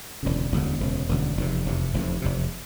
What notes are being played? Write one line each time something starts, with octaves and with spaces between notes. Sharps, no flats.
E1 D2 C#3
E1 D2 C#3
E1 D2 C#3
E1 D2 C#3
F1 E2 C3
F1 E2 C3
F1 E2 C3
F1 E2 C3